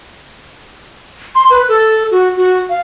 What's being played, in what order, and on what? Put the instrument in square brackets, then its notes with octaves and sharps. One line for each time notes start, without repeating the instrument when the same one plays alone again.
[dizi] C6
B4
A4
F#4
F#4
F5